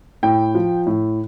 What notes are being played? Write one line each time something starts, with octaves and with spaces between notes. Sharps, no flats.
A2 G5
F3
A2